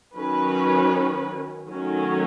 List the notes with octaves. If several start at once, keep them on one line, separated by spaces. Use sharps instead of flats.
D#3 F#3 C#4 B4
D#3 F#3 A3 C#4